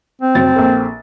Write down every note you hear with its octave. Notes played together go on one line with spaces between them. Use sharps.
C4
F1 F#3 A6
A#1 A#3 A4